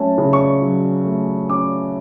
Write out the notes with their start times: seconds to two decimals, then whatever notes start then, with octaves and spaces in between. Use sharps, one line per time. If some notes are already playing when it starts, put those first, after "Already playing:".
Already playing: F#3 A3 C#4 A5
0.18 C#3
0.33 C#6
0.62 F#3
1.05 A3
1.49 C#4 D6